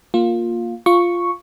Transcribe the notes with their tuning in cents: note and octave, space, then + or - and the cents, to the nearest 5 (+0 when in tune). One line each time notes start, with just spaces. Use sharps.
A#3 +0 F4 +10
F4 +0 C#6 +0